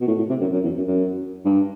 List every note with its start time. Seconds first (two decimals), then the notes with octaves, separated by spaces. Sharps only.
0.01 B2
0.08 A2
0.18 A2
0.30 C3
0.41 F#2
0.53 F#2
0.64 E2
0.76 F#2
0.87 F#2
1.45 G2